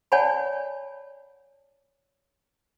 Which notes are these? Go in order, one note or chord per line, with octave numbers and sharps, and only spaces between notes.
C#5 D5 F#5 G#5 A5 B5